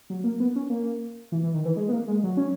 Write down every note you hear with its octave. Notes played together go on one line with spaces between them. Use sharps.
F#3
A#3
B3
C#4
A#3
E3
E3
D#3
E3
G#3
B3
A#3
G#3
F#3
C#4